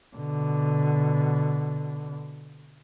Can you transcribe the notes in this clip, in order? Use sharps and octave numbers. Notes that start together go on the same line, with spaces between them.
B2 D3